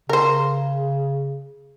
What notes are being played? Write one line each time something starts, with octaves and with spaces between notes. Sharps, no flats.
C#3 A#4 C5